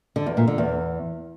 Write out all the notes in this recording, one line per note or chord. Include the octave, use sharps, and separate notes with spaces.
D3
E2
A#2
D3
E2